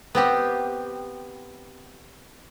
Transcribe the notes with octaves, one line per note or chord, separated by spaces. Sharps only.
B3 C4 G4